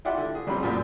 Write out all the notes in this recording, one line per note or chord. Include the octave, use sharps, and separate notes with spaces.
E4 F4 G4 D5 E5 F#5
D3
G#4
A1 F#3 G3 C4 B5
F#2 A#2 F3 G3